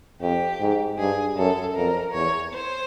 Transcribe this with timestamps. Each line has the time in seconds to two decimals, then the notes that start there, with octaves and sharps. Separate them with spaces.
0.21 F2 G4
0.60 G#2
0.99 G2 G#4
1.37 F#2 A4
1.76 F2 A#4
2.14 E2 C#5
2.53 C5